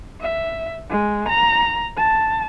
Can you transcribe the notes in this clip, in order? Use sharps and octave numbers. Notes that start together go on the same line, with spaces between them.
E5
G#3
A#5
A5